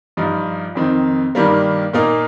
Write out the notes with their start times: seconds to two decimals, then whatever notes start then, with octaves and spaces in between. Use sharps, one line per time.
0.17 G2 F3 D#4
0.75 F2 D#3 C4 D#4
1.35 G2 D#3 G3 A#3
1.93 A#2 A#3 D#4